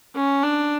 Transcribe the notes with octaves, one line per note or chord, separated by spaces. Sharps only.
C#4
D4